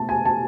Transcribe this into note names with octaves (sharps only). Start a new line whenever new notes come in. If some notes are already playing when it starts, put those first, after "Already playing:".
Already playing: B2 A3 A5
G#5
A5